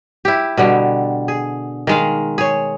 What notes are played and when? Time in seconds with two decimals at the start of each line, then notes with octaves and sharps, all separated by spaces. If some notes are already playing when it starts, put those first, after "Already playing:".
0.25 E4 G4
0.57 B2 D3 G3
1.28 G#4
1.87 D#3 G#3 F5
2.38 G#4 C#5